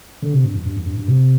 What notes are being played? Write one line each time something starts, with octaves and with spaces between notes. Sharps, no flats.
D3
C3
G2
E2
G2
E2
G2
G2
C3